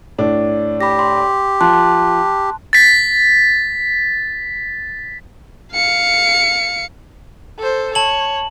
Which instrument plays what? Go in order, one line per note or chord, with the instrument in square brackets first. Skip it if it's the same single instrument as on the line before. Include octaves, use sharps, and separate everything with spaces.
[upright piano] A2 D4
[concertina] G4 [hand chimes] B5 A#6
[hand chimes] C6
[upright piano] F3 [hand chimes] A5 C6 F#6
[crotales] A6 B6
[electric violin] F5 C#7
[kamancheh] A4 C5
[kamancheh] C#5 [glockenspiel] A5 F#7